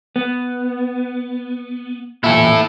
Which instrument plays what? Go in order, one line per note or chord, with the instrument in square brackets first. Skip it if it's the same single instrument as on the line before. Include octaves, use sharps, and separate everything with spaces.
[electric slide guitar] B3
[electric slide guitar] E2 A#2 [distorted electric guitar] E4 A4